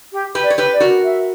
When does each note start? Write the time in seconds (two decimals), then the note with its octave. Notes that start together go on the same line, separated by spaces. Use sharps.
0.12 G4
0.35 G4 B4
0.43 D5
0.50 C#5
0.58 G4 B4
0.73 D5
0.80 F#4 A#4
1.04 E5